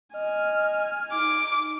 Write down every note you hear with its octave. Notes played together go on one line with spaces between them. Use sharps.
D#5 G#5 F6
D#4 D6